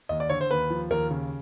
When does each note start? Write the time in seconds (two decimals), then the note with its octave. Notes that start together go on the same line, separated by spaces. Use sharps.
0.09 D#2 D#5
0.20 D5
0.29 D3 C#5
0.41 C5
0.51 D#2 B4
0.70 F3
0.90 D#2 A#4
1.11 C#3